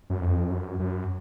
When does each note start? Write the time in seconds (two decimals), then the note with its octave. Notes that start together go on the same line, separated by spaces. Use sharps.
0.10 F#2
0.21 F2
0.50 F#2
0.79 F#2